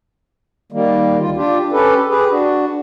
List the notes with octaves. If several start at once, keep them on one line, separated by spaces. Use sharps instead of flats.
D#3 G3 A#3
D2 F4
D4 F4 G4
C#4 G4 A4 B4
G4 G#4 B4
D4 F#4